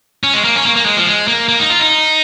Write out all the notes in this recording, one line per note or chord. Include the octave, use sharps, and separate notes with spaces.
C#4
G#3
A#3
C#4
A#3
A#3
G#3
F3
G#3
A#3
A#3
D#4
F4
D#4